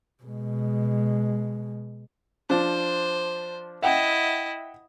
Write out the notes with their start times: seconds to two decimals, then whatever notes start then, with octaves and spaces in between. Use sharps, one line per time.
0.23 B2 G#3
2.50 F3 D4 C5
3.82 E4 D#5 E5 F#5 G5